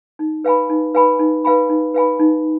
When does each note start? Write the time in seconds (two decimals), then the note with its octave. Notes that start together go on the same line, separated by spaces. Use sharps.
0.19 D#4
0.44 B4 F5 G#5 B5
0.69 D#4
0.94 B4 F5 G#5 B5
1.19 D#4
1.44 B4 F5 G#5 B5
1.69 D#4
1.94 B4 F5 G#5 B5
2.19 D#4